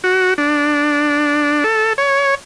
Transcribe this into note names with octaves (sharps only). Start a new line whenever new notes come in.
F#4
D4
A4
C#5